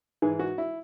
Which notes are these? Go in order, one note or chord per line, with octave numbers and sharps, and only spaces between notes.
G#2 E3 G#4
F#4
E4